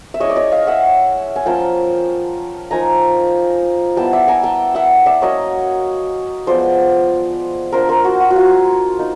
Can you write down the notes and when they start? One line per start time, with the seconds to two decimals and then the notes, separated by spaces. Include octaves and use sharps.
0.14 E5
0.20 G#3 C#4 E4 C#5 D#5
0.30 D5
0.36 C#5 D#5
0.52 D#5 F5
0.67 E5 F#5
1.36 G#5
1.46 F3 A#3 C#4 F4 G5 A5
2.71 F3 A#3 D#4 G#5 A#5
3.97 G3 B3 E4 G5 A5
4.13 D5 E5
4.28 G#5 A#5
4.43 G5 A5
4.75 E5 F#5
5.06 D5 E5
5.22 F#3 A#3 C#4 C#5 D#5
6.47 F3 G#3 B3 C5 D5
7.72 A#3 D4 F4 A#4 C5
7.89 A#4 C5
8.05 F#4
8.20 F#4
8.31 F#4
8.36 F4
8.98 A#3 D#4